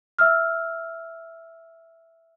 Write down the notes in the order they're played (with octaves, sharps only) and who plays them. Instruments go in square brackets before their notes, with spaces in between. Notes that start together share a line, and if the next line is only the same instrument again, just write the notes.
[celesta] E5 E6 F6